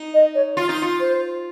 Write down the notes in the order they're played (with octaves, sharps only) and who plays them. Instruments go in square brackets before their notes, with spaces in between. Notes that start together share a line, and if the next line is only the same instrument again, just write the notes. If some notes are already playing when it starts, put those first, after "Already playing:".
Already playing: [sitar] D#4
[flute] D#5
C#5
[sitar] F4
D#4
F4
[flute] C5